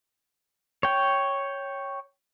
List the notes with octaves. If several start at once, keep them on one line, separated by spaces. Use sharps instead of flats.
C#5 G5